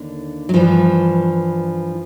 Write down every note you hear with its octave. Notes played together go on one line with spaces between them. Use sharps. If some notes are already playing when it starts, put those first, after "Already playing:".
Already playing: D#2 D3
F#3
G2 E3 F3